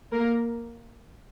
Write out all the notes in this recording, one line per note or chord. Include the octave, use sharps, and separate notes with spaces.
A#3 A#4